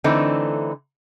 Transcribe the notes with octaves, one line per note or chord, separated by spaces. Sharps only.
D3 E3 A3 C4 D#4